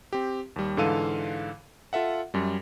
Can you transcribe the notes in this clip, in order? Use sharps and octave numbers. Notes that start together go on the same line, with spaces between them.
C4 G4
D#2 G3
G#2 D3 E3 A4 F5 D#7
F4 A4 E5 F#5
F#2 G3